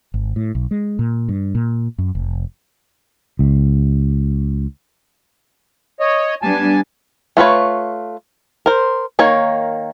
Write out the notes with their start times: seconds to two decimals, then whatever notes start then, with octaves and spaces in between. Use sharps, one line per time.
0.14 G#1
0.36 A2
0.55 B1
0.71 G#3
0.99 A#2
1.29 G2
1.55 A#2
1.98 F#2
2.15 F1
3.39 C#2
6.00 C#5 D#5
6.42 G3 B3 D4 G#5 A5
7.37 A3 F4 B4 C#5
8.66 A#4 C5
9.19 D#3 A#3 C#5